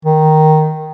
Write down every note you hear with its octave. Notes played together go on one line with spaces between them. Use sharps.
D#3